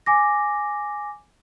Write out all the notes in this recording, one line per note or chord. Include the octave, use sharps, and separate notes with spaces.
G#5 D6 A#6